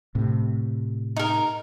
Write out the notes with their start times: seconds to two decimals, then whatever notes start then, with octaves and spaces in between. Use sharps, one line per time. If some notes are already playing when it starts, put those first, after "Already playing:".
0.15 A2 C3
1.16 D#4 A#4